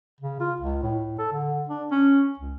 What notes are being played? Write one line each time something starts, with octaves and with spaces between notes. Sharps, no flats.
C#3
F4
C#2
A2
A4
D3
D4
C#4
C#2